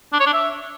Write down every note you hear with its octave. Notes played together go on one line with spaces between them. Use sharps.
D4
C#5
D4
E5